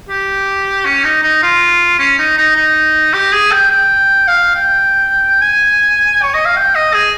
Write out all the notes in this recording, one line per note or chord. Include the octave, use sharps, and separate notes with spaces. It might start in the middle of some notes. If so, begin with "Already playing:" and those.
G4
C#4
D#4
D#4
F4
C#4
D#4
D#4
D#4
G4
G#4
G5
G5
F5
G5
G#5
C#5
D#5
F5
G5
D#5
G#4